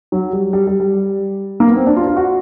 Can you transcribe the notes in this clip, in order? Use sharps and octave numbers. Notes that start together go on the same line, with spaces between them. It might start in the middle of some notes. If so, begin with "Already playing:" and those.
F#3
G3
G3
G3
G3
A#3
B3
C4
D4
F4
F4
F#4